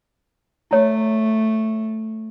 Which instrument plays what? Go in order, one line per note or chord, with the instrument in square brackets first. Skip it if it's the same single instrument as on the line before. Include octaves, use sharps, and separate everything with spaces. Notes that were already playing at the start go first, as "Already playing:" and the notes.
[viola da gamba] A3 [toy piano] E4 C#5